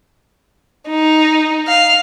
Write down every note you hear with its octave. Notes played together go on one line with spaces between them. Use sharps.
D#4
F5